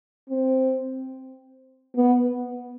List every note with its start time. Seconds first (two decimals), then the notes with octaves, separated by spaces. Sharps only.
0.29 C4
1.96 B3